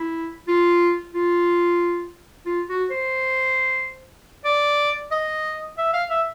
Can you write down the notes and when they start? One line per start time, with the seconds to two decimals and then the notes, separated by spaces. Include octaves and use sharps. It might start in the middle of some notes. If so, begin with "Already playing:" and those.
Already playing: E4
0.48 F4
1.14 F4
2.46 F4
2.69 F#4
2.90 C5
4.45 D5
5.11 D#5
5.78 E5
5.93 F5
6.10 E5